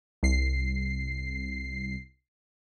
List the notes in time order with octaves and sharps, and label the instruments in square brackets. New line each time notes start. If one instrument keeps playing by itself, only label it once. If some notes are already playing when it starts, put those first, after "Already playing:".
[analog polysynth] C2 C7